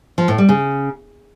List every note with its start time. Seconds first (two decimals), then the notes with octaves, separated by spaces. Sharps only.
0.18 F3
0.28 A2
0.38 G3
0.49 C#3